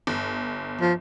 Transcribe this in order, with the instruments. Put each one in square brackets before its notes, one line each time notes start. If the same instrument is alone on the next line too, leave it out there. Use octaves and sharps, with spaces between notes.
[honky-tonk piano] G1
[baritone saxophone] F3